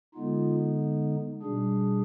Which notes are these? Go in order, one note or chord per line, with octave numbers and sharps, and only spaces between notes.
D3 G#3 B3 D#4 F4
B2 G3 D4 G#4